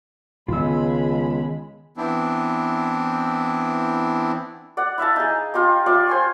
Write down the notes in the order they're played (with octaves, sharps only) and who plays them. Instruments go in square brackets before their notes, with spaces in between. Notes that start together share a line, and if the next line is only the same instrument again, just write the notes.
[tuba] C#2 [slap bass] D#3 B3 [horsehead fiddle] G#3 B5 [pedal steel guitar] F4 E6
[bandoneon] E3 B3 C4 D4 E4
[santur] D5 F#5
E4 E5 F5 A5
D#4 G#4
F4 G4 D#5
F4 D5 E5
C5 G#5 C#6